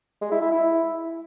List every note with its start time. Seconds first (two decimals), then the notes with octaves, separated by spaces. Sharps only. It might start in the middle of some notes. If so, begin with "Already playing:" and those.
0.22 G#3
0.32 E4
0.42 E4
0.52 E4